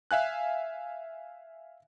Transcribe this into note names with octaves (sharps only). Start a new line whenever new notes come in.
E5 F5 G#5 F#6